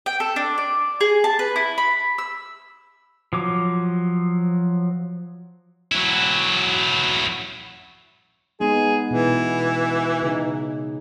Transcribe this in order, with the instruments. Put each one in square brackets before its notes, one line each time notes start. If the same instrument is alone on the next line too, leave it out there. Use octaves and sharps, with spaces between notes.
[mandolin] G5
A4
D4
D5
G#4
A5
B4
E4
B5
E6
[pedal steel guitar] F3 F#3 D6
[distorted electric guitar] F#3 E4
[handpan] G#3 B3 D#4 [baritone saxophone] G#4
[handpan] B2 [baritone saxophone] E3
[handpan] C#3 D#4